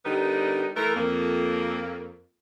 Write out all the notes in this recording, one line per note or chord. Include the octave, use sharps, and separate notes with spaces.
D3 G3 B3 D#4 A#4
E3 A3 A#4
F2 A#3